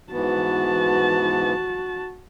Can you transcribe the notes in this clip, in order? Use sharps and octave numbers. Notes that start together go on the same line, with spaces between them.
G#2 E3 B3 F#4 A5